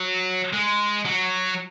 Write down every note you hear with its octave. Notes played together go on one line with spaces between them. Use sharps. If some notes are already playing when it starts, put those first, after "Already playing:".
Already playing: F#3
G#3
F#3